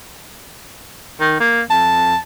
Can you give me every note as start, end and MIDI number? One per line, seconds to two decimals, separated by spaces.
1.20 1.39 51
1.40 1.62 58
1.70 2.14 41
1.70 2.17 81